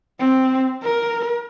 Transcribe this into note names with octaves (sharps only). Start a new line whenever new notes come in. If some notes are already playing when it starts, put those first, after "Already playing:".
C4
A#4